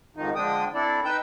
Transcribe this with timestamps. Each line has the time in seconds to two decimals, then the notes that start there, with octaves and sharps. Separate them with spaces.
0.16 F2 G#2 D#3 F3 D#4
0.35 D3 F3 G#3 D4 G5 D#6
0.74 C4 D4 E4 A4 D5
1.05 D#4 B4 G5 E6 G6